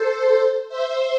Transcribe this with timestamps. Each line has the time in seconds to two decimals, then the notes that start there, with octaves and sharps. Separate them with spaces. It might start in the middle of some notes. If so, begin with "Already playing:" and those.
Already playing: A4 C5
0.68 C5 E5